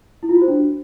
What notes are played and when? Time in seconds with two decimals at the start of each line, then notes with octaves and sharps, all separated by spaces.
0.23 E4
0.29 F4
0.35 F#4
0.42 C5
0.48 D4